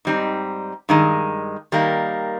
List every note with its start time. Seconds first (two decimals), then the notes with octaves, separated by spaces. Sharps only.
0.05 G#2 G3 C4 D#4
0.89 G2 D#3 G#3
1.72 D#3 G3 A#3